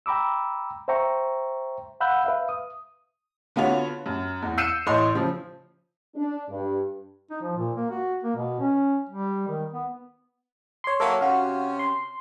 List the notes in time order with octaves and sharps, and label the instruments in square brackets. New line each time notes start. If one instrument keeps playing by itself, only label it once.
[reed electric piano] G5 A#5 B5 D6 E6
C5 E5 G5 A#5 C#6
F5 F#5 B5 E6 F#6 G6
B4 E5 F5
D#6
[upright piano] D3 B3 F4 F#4 C#5
F#2
E2
E6 G6 C7 C#7 D#7 E7
A1 E3 C#5 D#5 C6
C#3 F3
[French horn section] D4
G2
[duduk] D#4
F3
A#2
A#3
F#4
A#3
B2
C#4
G3
D#3
B3
[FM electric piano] C#5 C6
[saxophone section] F#3 A#3 [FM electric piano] A4 C#5 E5
[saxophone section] C3 C#4 [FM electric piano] F#4 F5
[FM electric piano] C6